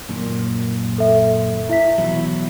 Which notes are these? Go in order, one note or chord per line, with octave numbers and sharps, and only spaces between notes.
F#2 A#2 D#3
A4 E5
E4 E5 B6
B2 E3 F#3